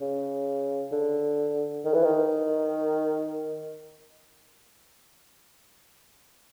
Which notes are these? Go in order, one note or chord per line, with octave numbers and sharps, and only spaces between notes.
C#3
D3
D#3
E3
D#3